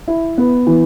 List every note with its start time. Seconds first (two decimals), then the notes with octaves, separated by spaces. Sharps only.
0.08 E4
0.38 B3
0.67 E3